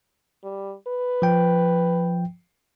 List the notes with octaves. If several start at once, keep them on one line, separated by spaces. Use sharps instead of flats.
G3
B4
F3 G5